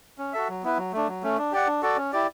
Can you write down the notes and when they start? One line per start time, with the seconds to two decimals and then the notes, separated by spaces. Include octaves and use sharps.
0.18 C#4
0.33 F#4 A4 E5
0.48 F#3
0.63 B3 E4 B4
0.78 F#3
0.93 A3 D4
1.08 F#3
1.23 A3 C#4
1.38 D4
1.52 G4 D5 F#5
1.67 D4
1.82 F#4 A4 D5
1.97 C#4
2.12 E4 G4 D5